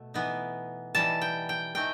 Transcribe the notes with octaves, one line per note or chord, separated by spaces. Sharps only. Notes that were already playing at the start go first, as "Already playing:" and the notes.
Already playing: B2 A3
E3 B3 D#4
E3 G3 D#4 A5
G5
G5
E3 A3 D#4 G5